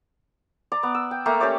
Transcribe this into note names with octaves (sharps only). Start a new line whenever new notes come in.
D5 A#5
B3
E6
G5
A3 A#3 G5 A#5
C#4 G4 C#5 D5